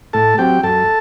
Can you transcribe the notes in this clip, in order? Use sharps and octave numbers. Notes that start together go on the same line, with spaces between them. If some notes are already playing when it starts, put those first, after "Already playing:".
A2 A4 A5
F#3 C4 G4 G5
F#2 A4 A5